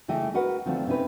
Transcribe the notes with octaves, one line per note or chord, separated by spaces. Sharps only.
C#3 E3 A3 D#5 G5
F#4 A#4 B4 D#5 F#5
D3 D#3 F3 A3 C4
C3 C4 C#4 D#4 B4